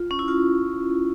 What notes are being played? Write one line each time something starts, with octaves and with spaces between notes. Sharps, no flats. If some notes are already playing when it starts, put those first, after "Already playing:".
Already playing: F4
C#4
E4
F4